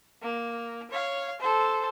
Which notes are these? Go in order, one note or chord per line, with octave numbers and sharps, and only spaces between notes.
A#3
C#5 F5
A4 C5